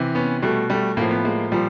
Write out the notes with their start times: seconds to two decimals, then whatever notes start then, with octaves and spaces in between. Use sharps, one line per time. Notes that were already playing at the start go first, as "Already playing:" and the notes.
Already playing: C3 E3
0.15 B3 C#4
0.42 B2 G3 A3
0.70 G3 A3
0.97 A2 F3 A#3
1.11 B3
1.25 G#3 A#3
1.52 A#2 F3 G3